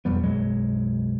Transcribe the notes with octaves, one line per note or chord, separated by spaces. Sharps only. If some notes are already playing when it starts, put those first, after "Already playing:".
E1 F2 G3 B3
B1 F#2 F#3 G#3